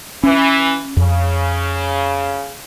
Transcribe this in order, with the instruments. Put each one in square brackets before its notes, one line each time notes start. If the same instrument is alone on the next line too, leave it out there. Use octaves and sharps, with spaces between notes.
[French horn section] E3 [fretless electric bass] C#4
[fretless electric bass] F2 [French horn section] C#3